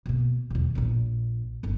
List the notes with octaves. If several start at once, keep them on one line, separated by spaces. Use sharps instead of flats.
B2 A#3
E1 D#2
A#1 A#2
G1 C#3